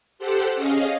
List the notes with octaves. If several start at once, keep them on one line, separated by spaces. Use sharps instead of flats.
G4 A4 C5 F#5
C#4 G#4 D#5 F5